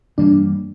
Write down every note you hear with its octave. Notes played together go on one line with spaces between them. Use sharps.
G2 E3 G3 A#3 D4